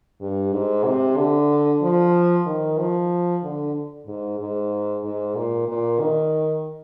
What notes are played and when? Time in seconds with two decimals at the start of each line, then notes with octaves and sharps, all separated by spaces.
0.21 G2
0.53 G#2
0.85 C3
1.17 D3
1.82 F3
2.46 D#3
2.78 F3
3.43 D3
4.07 G#2
4.40 G#2
5.04 G#2
5.36 A#2
5.69 A#2
6.01 D#3